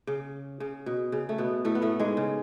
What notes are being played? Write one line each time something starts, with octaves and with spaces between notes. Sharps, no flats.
C#3
C#3
B2
C#3
A3
B2 B3
A2 A3
B3
A2 A3
G#2 G#3
C#3